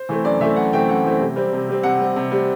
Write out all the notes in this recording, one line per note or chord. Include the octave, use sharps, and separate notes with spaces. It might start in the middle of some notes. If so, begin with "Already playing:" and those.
Already playing: C5
E3 A3 C4
F#2 D5
E3 A3 C4 E5
F#2 F#5
E3 A3 C4 G5
F#2 F#5
E3 A3 C4
C3
G3 C4
C3
G3 C4
C3 F#5
G3 C4
C3
G3 C4